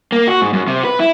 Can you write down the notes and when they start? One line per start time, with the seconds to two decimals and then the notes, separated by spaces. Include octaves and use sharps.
0.12 A#3
0.28 F#4
0.42 G#2
0.53 F#2
0.68 C3
0.85 B4
1.00 E4